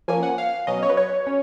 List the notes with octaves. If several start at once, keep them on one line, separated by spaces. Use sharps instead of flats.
F3 A#3 C#4 G#5
F#5
F5
B2 F#3 C#4 D#5
C#5
B4
C#5
C#4